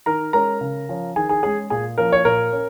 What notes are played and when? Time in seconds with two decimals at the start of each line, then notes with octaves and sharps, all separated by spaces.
0.06 D#3 A#4 A#5
0.33 G#3 C#4 A#4 A#5
0.61 C#3
0.89 F3 C#4
1.16 D#3 G#4 G#5
1.29 G#4 G#5
1.43 G#3 C#4 G#4 G#5
1.70 A#2 G#4 G#5
1.98 F3 A#3 C#4 A#4
2.12 C#5
2.25 A#2 A#4
2.53 C#4